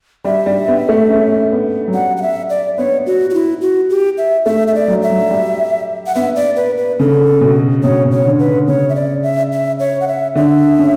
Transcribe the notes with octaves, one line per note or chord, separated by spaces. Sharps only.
G3 E5
G3
B3
A3
C#4
B3
F#3
G3 F#5
F#5
E5
D5
B3 C#5
F#4
F#4
E4
F#4
G4
E5
A3 E5
E5
D5
F#3
E5
F#3
G3
F#5
B3 E5
D5
B4
B4
C#3 A4
B2
B2 C#5
B2
C#5
D3
B4
D3
C#3 C#5
E5
D5
E5
E5
C#5
F#5
E5
D3 E5
C#4